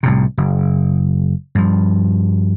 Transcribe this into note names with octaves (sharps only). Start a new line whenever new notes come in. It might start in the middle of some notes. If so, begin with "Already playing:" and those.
C2 A2 C3
F#1
G2 F3